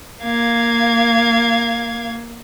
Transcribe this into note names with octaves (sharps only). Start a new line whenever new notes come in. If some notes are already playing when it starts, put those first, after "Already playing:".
A#3 F5 G#6